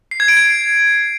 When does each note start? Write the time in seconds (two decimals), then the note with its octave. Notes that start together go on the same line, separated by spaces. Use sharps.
0.11 C7
0.20 G#6
0.28 D7
0.37 G#6